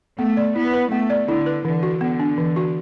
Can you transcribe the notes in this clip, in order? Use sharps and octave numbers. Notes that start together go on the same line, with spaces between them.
A3 B3
D5
B3 E4
B4
A3 B3
D5
D3 E4
B4
D3 E3
F#4
D3 B3
D4
E3
F#4